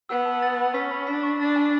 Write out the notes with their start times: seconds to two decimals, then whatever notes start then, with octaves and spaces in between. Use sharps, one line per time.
0.09 B3 E6
0.26 A5
0.42 A6
0.58 B5
0.74 C#4 B6
0.91 B5
1.07 D4 B6
1.23 C#6
1.40 D4 A6
1.56 G#5